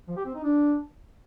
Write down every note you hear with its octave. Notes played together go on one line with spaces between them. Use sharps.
F3
G4
C4
D#4
D4